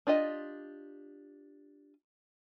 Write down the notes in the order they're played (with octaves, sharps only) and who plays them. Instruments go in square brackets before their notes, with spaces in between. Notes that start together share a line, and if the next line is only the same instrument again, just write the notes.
[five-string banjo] D4 F4 G4 D#5